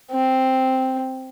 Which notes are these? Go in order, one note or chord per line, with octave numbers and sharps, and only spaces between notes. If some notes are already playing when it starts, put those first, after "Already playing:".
C4